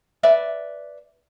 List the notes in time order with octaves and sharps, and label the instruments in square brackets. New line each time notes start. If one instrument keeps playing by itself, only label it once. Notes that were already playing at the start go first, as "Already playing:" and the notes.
[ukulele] B4 D5 E5